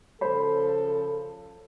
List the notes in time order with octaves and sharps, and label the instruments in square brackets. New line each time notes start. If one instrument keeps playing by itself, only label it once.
[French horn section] C#3 F3 A4 [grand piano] C5 B5